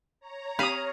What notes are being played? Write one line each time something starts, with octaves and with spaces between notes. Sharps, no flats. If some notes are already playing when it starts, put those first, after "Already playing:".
C#5 A#5
C4 G4 F5 B5 D#6